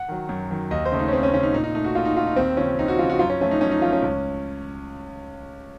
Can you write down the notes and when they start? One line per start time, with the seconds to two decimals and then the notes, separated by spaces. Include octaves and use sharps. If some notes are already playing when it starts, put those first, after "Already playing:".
Already playing: F#5
0.08 D#3 F#3
0.29 F#2
0.51 D#3 F#3
0.71 D#2 D#5
0.85 C5
0.92 C#3 A3
0.99 D#4
1.08 C#4
1.12 D#2 C4
1.23 C#4
1.34 C#3 A3 C#4
1.43 D#4
1.53 A#2 D#4
1.64 D#4
1.75 A3 D#4
1.84 F#4
1.95 A#2 F4
2.05 D#4
2.16 A3 F4
2.27 D#4
2.36 D#2 C4
2.57 C#3 F3 C#4
2.78 D#2 D#4
2.88 F#4
2.99 C#3 F3 F4
3.10 F#4
3.19 F#2 F4
3.30 C#4
3.41 F3 A3 C#4
3.51 D#4
3.61 F#2 C#4
3.71 D#4
3.82 F3 A3 F4
3.93 C#4
4.02 C#2